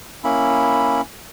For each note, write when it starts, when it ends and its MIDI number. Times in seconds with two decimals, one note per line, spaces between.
0.24 1.01 58
0.24 1.01 61
0.24 1.01 64
0.24 1.01 83